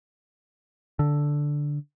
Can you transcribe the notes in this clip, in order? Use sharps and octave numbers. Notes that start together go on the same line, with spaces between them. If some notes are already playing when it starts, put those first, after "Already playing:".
D3